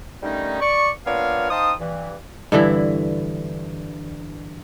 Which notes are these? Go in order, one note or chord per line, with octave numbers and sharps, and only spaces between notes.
D3 D#3 G3 A3 C#4 D#4
D5 C#6
A#3 B3 D4 F4 C#5 F5
D#4 C5 F5 G5 A5 D#6
G2 E3
G2 D3 E3 E4